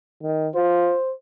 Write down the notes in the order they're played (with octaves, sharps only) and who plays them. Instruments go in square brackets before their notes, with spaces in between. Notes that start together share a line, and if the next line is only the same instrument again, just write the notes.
[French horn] D#3
[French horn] F4 [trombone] C5